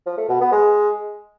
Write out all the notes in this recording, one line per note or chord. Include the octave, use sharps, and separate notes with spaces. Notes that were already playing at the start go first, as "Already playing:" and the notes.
F3
A3
B2
B3
G#3